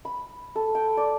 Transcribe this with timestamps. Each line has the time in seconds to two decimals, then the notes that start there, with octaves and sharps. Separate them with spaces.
0.05 B5
0.56 A4
0.75 G5
0.97 D5